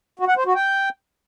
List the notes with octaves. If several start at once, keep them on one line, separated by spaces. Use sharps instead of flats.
F#4
F#5
C5
F#4
G5